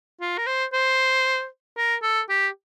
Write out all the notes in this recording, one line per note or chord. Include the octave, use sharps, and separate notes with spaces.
F4
A#4
C5
C5
A#4
A4
G4